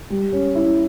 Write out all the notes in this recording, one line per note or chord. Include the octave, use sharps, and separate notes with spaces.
G3
C#4
E4